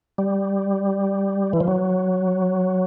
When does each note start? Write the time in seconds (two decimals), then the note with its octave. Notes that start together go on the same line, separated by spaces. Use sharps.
0.18 G3
1.53 E3
1.60 F3
1.67 F#3